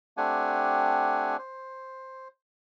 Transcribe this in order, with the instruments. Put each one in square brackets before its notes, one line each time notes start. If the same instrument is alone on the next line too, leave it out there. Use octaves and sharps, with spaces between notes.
[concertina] A3 C4 D4 G4 F#5 G#5
C5